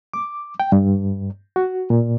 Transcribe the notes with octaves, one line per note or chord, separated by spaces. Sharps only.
D6
G5
G2
F#4
A#2